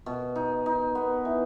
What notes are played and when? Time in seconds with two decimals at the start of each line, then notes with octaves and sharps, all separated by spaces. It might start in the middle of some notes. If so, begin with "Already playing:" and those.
0.06 B2
0.36 D#4
0.66 D#4
0.95 B3
1.25 E3